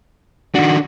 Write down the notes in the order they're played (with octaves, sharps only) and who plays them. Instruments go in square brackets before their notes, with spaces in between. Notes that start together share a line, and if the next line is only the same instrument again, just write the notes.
[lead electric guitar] D#3 D4 [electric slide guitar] F#4